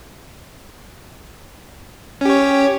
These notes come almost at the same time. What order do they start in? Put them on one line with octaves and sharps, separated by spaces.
C#4 G4 C#5